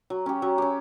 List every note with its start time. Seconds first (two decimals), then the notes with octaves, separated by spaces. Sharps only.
0.10 F#3
0.26 C#4 G4
0.42 F#3
0.58 C#4 G4